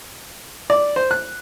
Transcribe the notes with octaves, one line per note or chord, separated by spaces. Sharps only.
D5
C5
F#6